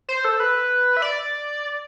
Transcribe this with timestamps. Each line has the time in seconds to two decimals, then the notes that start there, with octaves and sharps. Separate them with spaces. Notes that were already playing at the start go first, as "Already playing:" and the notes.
0.09 C5
0.24 A4
0.40 B4
0.97 E5
1.02 D5